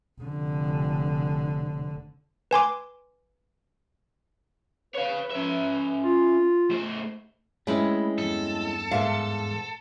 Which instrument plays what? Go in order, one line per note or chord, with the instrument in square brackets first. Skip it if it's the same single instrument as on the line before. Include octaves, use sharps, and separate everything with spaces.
[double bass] F1 D3
[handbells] B4 G#5 C6 D6
[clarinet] B4 [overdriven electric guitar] C#5 F5
[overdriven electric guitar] C#4 E5
[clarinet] F4
[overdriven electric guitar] A2 C5
[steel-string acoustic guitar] G#3 [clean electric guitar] A3 B4 B5 [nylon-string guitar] C4 C#4 E4
[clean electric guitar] E2 G2 [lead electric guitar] A4
[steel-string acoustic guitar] G#2 [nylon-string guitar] A#4 E5 F5